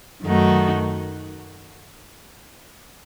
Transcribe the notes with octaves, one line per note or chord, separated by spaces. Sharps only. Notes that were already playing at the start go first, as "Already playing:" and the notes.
F#2 D#3 A3 D#4 F#4